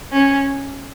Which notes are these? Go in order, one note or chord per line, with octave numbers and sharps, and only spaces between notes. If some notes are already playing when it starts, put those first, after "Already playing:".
C#4